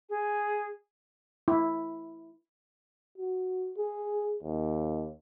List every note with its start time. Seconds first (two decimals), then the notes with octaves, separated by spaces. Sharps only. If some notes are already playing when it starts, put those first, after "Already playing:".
0.09 G#4
1.48 E4
3.18 F#4
3.78 G#4
4.43 D#2